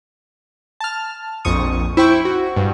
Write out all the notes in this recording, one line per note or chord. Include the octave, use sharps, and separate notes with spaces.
A5 F6
A#1 F2 C#6 D#6
E4 C5 G5 C#6
F#4
G2